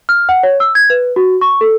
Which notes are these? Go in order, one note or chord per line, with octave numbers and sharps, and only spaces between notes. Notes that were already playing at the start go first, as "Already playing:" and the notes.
F6
F#5
C#5
E6
G#6
B4
F#4
C#6
A4